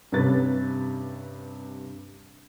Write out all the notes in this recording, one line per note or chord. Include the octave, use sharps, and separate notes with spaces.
G2 C3 C#4 B4 A6